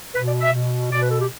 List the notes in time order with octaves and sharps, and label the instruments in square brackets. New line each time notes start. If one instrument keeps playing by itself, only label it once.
[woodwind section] B2 B4
D5
E5
B2
B2 D5
B4
A4
G4